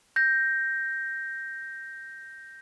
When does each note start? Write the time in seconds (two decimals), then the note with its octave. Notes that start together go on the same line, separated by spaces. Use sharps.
0.16 G6 A#6